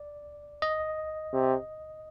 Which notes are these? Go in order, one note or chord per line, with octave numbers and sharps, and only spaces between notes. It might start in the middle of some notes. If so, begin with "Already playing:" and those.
Already playing: D5
D#5
C3